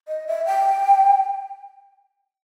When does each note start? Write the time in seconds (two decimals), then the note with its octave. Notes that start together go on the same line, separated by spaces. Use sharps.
0.08 D#5
0.27 E5
0.46 G5